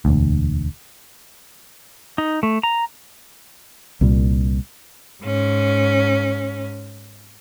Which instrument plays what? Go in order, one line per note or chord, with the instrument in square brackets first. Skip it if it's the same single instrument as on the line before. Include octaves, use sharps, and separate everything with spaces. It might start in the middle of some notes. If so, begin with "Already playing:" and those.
[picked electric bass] E1 D2
[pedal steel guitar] D#4
A3
A#5
[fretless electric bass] C2 A#2 G3
[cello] G#2 C#4